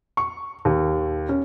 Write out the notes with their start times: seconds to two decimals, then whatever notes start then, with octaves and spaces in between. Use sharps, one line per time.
0.17 C#6
0.65 D#2
1.29 C#4